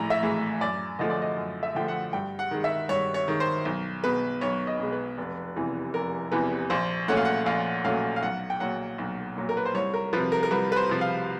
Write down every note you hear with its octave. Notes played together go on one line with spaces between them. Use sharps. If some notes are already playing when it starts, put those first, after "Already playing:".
Already playing: A#1 A2 E3 A#5
E5
A2 E3 G#3
F#2 D5
D3 F3 A3 D#5
D5
D#5
F#2
E5
D3 F3 A3 G5
F#5
G2 G5
F#5
D#3 G#3
E5
G2 C#5
C#5
D#3 G#3
C5
B1
B2 G#3 B4
B1 C#5
D#5
B2 G#3
B4
F1
E2 C3 E3
F1 A#4
E2 C3 E3 B4
A#1 C5
A#2 F#3 A3 C#4 F#5
F5
F#5
A#1 F5
A#2 F#3 A3 C#4 F5
F5
B1 F#5
G5
A#2 F#3 F#5
B1
A#2 F#3
A#4
B4
C5
C2 C#5
A#4
C3 F3 B4
A#4
A#4
C2 B4
B4
C5
C3 F3
F5